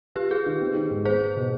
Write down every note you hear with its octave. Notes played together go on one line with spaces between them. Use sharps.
F4 G4 B4
F4 G#4
D#3
C4
D#3
G#2
B3 G#4 C5
B3
B2